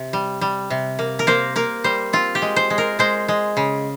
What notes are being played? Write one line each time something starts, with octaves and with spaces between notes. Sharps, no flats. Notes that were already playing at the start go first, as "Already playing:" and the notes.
Already playing: C3
G3
G3
C3
A#3
A#4
A#3 C5
A#3 A#4
G3 C5
C4 F4
G4
G#3
C5
G#3
A#4
G#3 C5
G#3
C#3